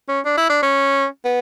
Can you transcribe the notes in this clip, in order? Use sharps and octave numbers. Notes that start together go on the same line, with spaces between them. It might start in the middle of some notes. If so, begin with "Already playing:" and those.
C#4
D4
E4
D4
C#4
B3